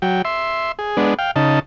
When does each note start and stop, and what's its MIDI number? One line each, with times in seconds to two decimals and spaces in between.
0.02 0.22 54
0.02 0.22 79
0.25 0.72 76
0.25 0.72 84
0.79 0.97 68
0.97 1.14 56
0.97 1.14 59
0.97 1.14 62
1.19 1.31 77
1.19 1.31 79
1.36 1.59 49
1.36 1.59 63
1.36 1.59 81